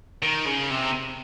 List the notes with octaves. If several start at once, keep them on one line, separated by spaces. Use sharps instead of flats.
D#3
C#3
C3